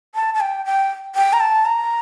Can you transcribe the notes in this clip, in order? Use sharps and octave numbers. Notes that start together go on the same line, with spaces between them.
A5
A5
G5
G5
G5
A#5
A5
A#5